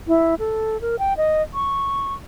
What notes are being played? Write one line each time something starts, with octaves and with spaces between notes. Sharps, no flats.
E4
A4
A#4
G5
D#5
C#6